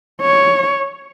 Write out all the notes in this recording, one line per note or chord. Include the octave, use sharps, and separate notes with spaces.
C#5